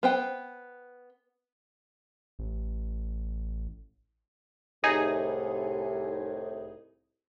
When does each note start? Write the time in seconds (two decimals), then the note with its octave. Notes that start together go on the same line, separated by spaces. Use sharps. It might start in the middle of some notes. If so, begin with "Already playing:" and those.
0.03 B3 C5 G5
2.39 A1
4.84 C2 A2 C3 D#4 G#4